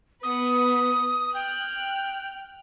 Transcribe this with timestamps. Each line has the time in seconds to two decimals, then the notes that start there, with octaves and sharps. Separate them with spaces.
0.23 B3 B4 D#6
1.34 G5 F6 F#6